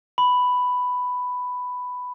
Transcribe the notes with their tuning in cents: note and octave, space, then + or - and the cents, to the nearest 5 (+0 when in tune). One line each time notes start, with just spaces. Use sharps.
B5 +5